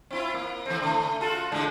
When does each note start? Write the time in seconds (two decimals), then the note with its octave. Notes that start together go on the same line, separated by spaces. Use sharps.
0.10 C4 E4 F4
0.34 A#3
0.66 D#3 A3 C4
0.81 C#3 A3
1.21 F4 F#4 A4
1.52 G#2 D3 G#3